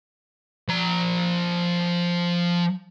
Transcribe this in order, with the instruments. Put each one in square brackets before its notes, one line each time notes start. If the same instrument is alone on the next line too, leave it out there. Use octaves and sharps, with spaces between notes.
[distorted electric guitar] F3 A#5